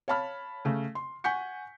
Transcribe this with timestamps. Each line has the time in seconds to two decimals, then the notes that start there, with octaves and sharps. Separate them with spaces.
0.08 C#5 F5 A5 B5 F6
0.65 C#3 A3
0.95 C6
1.24 F#5 G#5 C#6 G6 B6 C#7